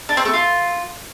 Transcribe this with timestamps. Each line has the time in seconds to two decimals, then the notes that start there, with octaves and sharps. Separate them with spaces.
0.09 D4
0.17 C4
0.25 A3
0.33 F4